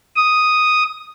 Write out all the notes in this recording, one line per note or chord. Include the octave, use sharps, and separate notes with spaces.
D#6